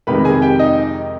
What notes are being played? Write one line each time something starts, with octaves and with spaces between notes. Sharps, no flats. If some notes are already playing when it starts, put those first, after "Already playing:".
F2 C3 D#3 G#3 B4 B5
G#4 G#5
G4 G5
D#4 D#5